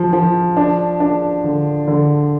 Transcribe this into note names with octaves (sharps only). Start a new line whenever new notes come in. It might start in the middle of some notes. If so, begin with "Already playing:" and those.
Already playing: F3
F3
D4
D4
D3
D3